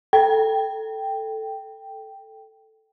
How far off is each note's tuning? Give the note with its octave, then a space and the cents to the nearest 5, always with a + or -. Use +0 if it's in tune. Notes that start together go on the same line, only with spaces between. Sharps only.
A4 +0 G5 +0